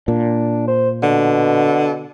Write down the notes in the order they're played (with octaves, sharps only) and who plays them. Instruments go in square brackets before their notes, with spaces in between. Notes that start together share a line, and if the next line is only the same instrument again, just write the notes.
[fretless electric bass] A#2 [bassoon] D4
[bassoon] C5
[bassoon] B2 [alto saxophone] D3